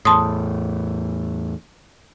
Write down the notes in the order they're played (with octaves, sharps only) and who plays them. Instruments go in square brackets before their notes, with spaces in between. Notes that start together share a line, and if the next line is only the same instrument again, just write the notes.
[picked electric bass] E2 A2 [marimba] A5 C6 D#6